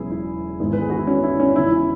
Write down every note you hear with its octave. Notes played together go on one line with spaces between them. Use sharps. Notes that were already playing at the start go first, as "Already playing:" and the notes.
Already playing: E1 E2 C#3 F#3 B3 E4 G#4
E4
G#1 G#2 E3 G#3 B3
B4
G#4
F#4
E4
C#4
E4
C#4
E1 E2 C#3 E3 E4
E4